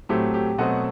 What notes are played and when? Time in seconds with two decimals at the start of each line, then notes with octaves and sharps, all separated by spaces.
0.09 A2 F#3 A3 C4 G4
0.34 G4
0.58 B2 F#3 A3 C4 D#5 F#5